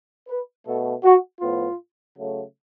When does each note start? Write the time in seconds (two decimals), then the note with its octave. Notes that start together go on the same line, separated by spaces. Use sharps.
0.28 B4
0.65 B2 A3 A4
1.03 F#4
1.41 A2 F3 B3 F4
2.16 C#3 F#3 A3